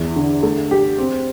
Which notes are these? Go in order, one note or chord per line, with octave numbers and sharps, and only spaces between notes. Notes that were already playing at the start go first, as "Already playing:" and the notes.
Already playing: E2 E4
D3
A3
G4
C4